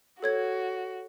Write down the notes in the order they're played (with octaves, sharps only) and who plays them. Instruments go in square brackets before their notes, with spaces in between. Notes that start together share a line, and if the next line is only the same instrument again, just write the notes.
[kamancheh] F#4 [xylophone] A4 C#5 G#6